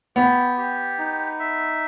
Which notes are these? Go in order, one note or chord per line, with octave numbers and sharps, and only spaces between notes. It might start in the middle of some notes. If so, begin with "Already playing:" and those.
B3 G4
G4
D#4
E5